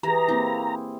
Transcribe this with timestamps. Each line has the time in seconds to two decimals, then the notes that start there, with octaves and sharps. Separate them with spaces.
0.03 E3 G4 G#4 A#5
0.28 A#3 C4 E4 G4